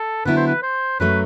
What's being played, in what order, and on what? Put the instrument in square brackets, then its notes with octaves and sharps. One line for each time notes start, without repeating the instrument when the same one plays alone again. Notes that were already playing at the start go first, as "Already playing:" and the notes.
Already playing: [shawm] A4
[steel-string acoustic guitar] D3 F#3 B3 E4 [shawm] B4
[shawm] C5
B4
C5
[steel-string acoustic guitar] F#2 F#3 A3 [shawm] B4